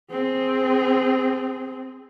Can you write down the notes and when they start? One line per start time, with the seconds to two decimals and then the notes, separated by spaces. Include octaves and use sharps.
0.11 C4 G#4